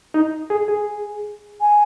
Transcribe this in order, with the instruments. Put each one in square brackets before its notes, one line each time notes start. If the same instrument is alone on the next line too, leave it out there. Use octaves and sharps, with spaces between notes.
[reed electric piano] D#4
G#4
G#4
[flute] G#5